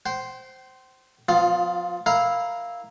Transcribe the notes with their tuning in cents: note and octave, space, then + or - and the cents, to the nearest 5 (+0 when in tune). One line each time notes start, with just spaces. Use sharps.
C5 +0 G5 -40
F3 +30 B3 +40 F4 +0
E4 -5 A#4 +0 F5 +0